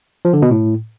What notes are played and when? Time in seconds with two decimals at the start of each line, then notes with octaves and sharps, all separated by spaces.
0.25 F3
0.33 D3
0.42 B2
0.51 A2